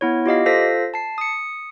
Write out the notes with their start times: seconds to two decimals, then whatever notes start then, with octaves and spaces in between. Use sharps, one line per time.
0.01 B3 E4 C#5
0.26 F4 G4 D#5 F5
0.46 F4 A4 C5 F5 A#6 B6
0.94 A5 C7
1.18 D#6 C#7